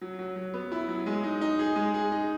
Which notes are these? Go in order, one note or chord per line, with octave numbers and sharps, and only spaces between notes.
F#3
F#3
F#3
B3
E4
F#3
G#3
D#4
D#4
G#4
G#3
G#4
D#4